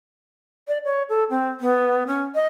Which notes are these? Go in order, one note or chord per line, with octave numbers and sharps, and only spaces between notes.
D5
C#5
A4
C4
B3
C#4
D#5